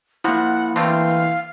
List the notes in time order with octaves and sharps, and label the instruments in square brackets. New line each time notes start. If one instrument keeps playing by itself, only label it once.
[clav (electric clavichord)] F3 [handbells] A#3 E4 [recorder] F#5
[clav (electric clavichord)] D3 A3 C4 [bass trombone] E3 [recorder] F5